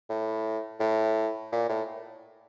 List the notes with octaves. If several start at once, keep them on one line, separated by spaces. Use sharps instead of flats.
A2
A2
A#2
A2